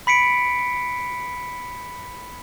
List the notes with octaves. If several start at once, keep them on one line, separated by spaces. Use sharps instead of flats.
B5 B6 C#7 D7